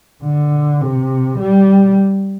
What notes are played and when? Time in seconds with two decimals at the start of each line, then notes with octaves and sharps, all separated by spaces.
0.24 D3
0.82 C3
1.39 G3